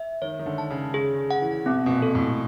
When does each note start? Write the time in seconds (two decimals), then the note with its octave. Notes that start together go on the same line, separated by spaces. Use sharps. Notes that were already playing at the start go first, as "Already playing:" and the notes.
Already playing: E5
0.22 D#3 C#5
0.39 D#3
0.46 D3
0.58 A5
0.70 C#3
0.94 C#3 G#4
1.31 F#5
1.42 E3
1.66 B2 C4
1.86 B2
1.90 A#2
2.02 A4
2.15 A2